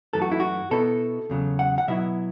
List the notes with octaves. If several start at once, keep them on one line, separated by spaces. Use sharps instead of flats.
F#2 E3 A3 A4
F#4
E4
F#4
B2 B3 E4 A4
E2 C#3 F#3
F#5
F#5
B2 F#3 B3 E4 E5